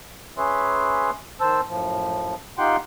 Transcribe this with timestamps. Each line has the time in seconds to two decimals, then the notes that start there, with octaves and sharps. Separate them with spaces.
0.38 C#4 G#4 B4 C#5 E5 C6
1.40 D#3 C5 A5 E6
1.68 F#2 A2 F3
2.58 D#4 F4 G4 F#5 G5 C6